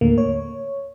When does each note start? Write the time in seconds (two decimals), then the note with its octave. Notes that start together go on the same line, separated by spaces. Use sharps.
0.01 D#2 A2 D3 A3 A#3
0.18 C#5